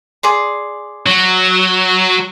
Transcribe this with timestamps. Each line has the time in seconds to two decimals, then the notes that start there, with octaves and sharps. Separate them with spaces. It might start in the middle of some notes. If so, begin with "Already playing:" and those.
0.23 G#4 D5 C6
1.06 F#3